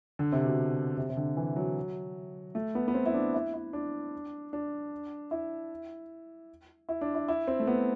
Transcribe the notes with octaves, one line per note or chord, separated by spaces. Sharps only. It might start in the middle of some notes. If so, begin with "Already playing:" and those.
D3
C3
B2
C3
C3
D3
E3
F#3
A3
B3
B3
C4
E4
D4
E4
E4
D4
D4
E4
E4
D4
E4
E4
C4
A3
B3